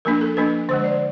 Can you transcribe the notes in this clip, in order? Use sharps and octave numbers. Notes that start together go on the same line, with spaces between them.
F3 A#3 D4 A#4
A4
F3 A#3 D4 B4
D3 F3 G#3 C5
D5